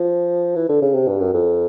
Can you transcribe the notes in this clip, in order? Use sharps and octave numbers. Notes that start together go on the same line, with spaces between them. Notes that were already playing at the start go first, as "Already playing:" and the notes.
Already playing: F3
E3
D3
C#3
C3
G2
F#2
F2